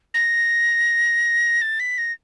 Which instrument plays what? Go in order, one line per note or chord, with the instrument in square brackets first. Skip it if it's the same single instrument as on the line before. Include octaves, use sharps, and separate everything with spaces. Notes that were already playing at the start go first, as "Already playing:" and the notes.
[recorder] A#6
A6
B6
A#6